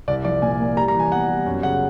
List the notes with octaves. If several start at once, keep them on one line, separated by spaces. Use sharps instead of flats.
C2 D5
F3 D5
A#2 G#5
A#3
G3 A#5
A#5
E3
G#5
B3 F#5
G3
F#2
C#3 F#5